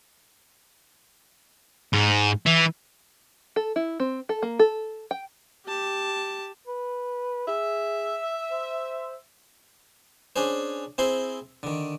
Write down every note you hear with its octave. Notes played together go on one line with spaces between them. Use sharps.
G#2
E3
A4
E4
C4
A4
A#3
A4
G5
G4 A5
B4
G#4 E5
C5
C#4 D4 G#4 C5
C4 E4 G#4 C5 C6
D3 D#3